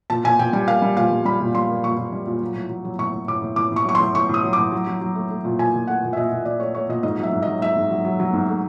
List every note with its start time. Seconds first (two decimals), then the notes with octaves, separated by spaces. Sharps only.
0.10 A#2 A5
0.24 A#2 G#5
0.39 A#2 G5
0.53 G3 G5
0.68 A#3 F5
0.82 G3
0.96 A#2 F5
1.11 G3
1.25 G3 B5
1.40 A#2
1.55 G3 C6
1.69 A#3
1.84 A#2 C#6
1.97 A#2
2.12 G3
2.27 A#2
2.42 F#3
2.55 A2
2.70 F#3
2.84 F#3
2.99 A2 C#6
3.13 A2
3.28 A2 D6
3.42 A2
3.56 A2 D6
3.72 A2 C#6
3.85 F#3 C#6
3.95 A2 C6
4.14 A2 C#6
4.29 A2 D#6
4.44 F#3
4.53 D6
4.58 A2
4.72 F#3
4.87 F#3
5.01 F#3
5.15 A3
5.30 A3
5.45 A#2
5.59 A#2 G#5
5.74 A#2
5.87 A3 F#5
6.03 A#2
6.13 E5
6.17 A#2 D#5
6.32 A#2
6.45 A#2 D5
6.60 A3 C#5
6.75 A3 C#5
6.89 A#2 D#5
7.03 G#2 D#5
7.18 F#3
7.23 E5
7.32 G#2
7.42 F#3 D#5
7.61 G#2 E5
7.76 G#2
7.91 F#3
8.05 F#3
8.20 F#3
8.33 G#2
8.48 A3